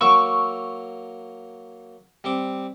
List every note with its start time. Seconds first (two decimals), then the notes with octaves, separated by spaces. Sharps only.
0.01 F#3 A#3 C#6 D6 E6
2.24 G3 C4 D6